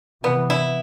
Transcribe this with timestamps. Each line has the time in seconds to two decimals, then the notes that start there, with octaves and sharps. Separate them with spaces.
0.24 C3 E3 B3
0.50 E4